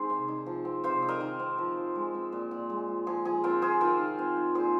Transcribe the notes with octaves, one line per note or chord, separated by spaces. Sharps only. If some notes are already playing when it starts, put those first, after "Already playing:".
Already playing: D#3 G#3 C4 G#4 C5
C3
D#4
F3
C4
C3 C5 F5
D#4
A#4 D#5
D#3
C4
F3
F3
G#3
C4
A#2
A#2
G#3
F4
F3 G#4
F3 G#4
C4 F4 A#4
F4 G#4 C5
D#3 F4 A#4
D#3
C4
D#4
A#2 G#4 C5